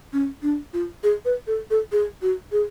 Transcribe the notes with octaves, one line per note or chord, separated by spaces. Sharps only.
C#4
D4
F4
G#4
B4
A4
A4
G#4
F#4
G#4